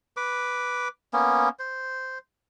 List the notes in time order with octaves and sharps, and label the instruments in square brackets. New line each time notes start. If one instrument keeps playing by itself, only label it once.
[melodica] B4 D6
A#3 B3 C#4
C5